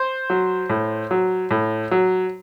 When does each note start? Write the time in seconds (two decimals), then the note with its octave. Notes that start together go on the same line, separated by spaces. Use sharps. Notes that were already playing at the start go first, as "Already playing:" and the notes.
Already playing: C5
0.30 F#3
0.70 A2
1.11 F#3
1.51 A2
1.91 F#3